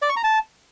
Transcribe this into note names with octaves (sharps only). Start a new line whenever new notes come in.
D5
C#6
A#5
A5